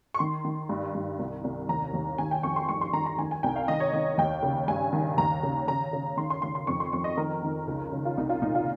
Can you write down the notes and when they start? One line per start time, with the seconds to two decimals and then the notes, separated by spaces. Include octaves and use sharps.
0.14 C#6
0.19 D#3 C6
0.45 D#3
0.69 G2
0.94 G2
1.19 C2
1.44 C2
1.69 D#2 A#5
1.93 D#2
2.18 D#3 G#5
2.31 G5
2.43 F2 C#6
2.56 C6
2.69 G2 C#6
2.81 C6
2.93 D#3 A#5
3.06 A#5
3.18 D#3 G#5
3.31 G#5
3.43 C2 G5
3.56 F5
3.68 D#3 D#5
3.80 C#5
3.93 D#3 D#5
4.18 D#2 G5
4.43 C#3
4.68 G2 G#5
4.93 D#3
5.18 D#2 A#5
5.43 C#3
5.68 C#3 A#5
5.93 C#3
6.17 D#3 C6
6.30 C6
6.42 D#3 C6
6.55 C6
6.67 F2 C#6
6.80 C6
6.93 F2 C#6
7.04 D#5
7.17 D#3 A#4
7.43 D#3
7.67 C#2
7.92 C#3
8.05 F4
8.17 C2 D#4
8.30 F4
8.42 A#2 D#4
8.55 F4